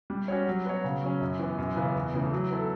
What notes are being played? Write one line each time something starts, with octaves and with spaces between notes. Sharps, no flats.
G3
C#4 F#4 C#5
F#3
B3 F#4 C#5
C#3
F#3 C#4
F#2
E3 B3
F#2
C#3 E3 B3
E2
C#3 E3 A3
F#3
B3 E4 A4